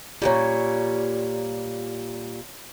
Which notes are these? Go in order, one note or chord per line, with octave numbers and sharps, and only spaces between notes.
A#2 D3 G3 F4 C#5